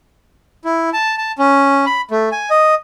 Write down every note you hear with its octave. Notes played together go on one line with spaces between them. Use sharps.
E4
A5
A5
C#4
B5
A3
G#5
D#5